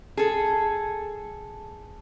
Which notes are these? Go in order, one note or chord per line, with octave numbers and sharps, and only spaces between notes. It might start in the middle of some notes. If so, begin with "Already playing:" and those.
G#4 A4